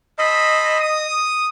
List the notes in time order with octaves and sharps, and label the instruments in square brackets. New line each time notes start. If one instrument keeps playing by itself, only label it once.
[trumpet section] A4 C5 B5 [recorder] D#5
[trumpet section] D#6